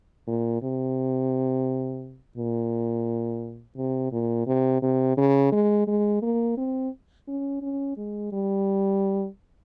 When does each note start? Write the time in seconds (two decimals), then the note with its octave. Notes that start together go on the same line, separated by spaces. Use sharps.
0.27 A#2
0.62 C3
2.37 A#2
3.77 C3
4.12 A#2
4.47 C3
4.82 C3
5.17 C#3
5.52 G#3
5.87 G#3
6.22 A#3
6.57 C4
7.28 C#4
7.62 C#4
7.97 G#3
8.32 G3